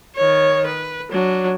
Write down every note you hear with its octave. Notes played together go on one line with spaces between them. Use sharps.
D#3 C#5
B4
F#3 D4